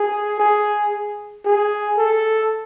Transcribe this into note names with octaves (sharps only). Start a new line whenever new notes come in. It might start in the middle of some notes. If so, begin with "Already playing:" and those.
Already playing: G#4
G#4
G#4
A4